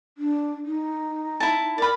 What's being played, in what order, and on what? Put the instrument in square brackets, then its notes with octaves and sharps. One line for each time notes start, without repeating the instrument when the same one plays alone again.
[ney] D4
D#4
[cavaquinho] E4 A5
[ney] A#4 [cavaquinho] D5 B5